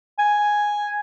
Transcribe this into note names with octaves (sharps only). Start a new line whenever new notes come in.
G#5